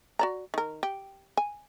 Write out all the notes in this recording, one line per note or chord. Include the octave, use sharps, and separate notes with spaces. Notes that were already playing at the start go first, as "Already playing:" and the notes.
F#4 D5 A#5
D#3 A#4
G4
G#5